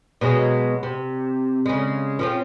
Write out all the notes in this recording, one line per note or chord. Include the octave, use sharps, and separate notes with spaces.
B2 F#3 G#3
C3
C#3 G#3
F3 C4 C#4